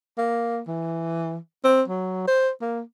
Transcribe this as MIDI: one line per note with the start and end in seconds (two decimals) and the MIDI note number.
0.18 0.60 58
0.67 1.37 52
1.64 1.82 60
1.88 2.23 54
2.28 2.50 72
2.61 2.81 58